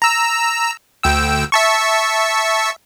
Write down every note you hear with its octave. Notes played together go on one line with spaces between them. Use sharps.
A#5 E6
D2 G5 E6
E5 A5 C#6